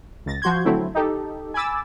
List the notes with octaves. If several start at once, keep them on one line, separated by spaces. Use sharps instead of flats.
C#2 A6 A#6
F3 F#4 C6 G6 G#6
D3 F#3 A3 C4 E4
D#4 G4 A4
G#5 B5 D6 E6 A6